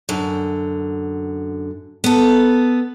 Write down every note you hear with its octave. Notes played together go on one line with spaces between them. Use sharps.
F#2 D3
B3 A4